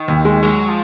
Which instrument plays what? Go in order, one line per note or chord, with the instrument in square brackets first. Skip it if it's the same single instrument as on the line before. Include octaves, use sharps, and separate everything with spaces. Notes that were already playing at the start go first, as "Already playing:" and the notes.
Already playing: [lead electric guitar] D#3
[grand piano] D#2
G#3
[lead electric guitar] F#3 [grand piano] G#3
[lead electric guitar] F3